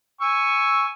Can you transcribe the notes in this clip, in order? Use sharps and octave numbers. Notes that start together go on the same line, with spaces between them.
G#5 C#6 E6